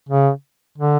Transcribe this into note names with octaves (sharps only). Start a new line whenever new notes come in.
C#3
D3